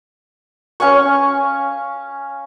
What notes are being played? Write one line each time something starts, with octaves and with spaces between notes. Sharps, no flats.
C#4 F5 G#5 C#6